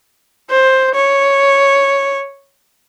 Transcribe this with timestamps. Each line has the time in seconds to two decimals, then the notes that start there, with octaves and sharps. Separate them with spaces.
0.50 C5
0.94 C#5